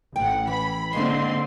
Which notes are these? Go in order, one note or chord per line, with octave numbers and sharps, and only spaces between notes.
A1 F#5 G5
E3 B5
D3 G#3 A#3 C4 D4 C6